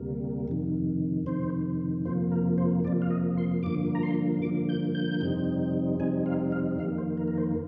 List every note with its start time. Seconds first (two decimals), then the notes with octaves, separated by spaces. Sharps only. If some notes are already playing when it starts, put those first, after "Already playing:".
Already playing: D2 C3 G3 A#3
0.48 F2 C3 D#3
1.26 F2 C3 D#3 C5
2.05 F2 C3 F3 A#3 C5
2.32 A#4
2.58 C5
2.84 F2 C3 F3 A#3 D5
3.02 F5
3.10 D#5
3.37 C6
3.63 G2 D3 F3 A#3 D6
3.95 A#5
4.03 C6
4.42 G2 D3 F3 A#3 D6
4.69 G6
4.95 G6
5.20 F2 C3 G3 C4 D#4
6.00 F2 C3 G3 C4 D#4 G#5
6.26 F5
6.52 F5
6.79 F2 D#3 A#3 F5
6.98 C5
7.17 A#4
7.28 A#4
7.38 C5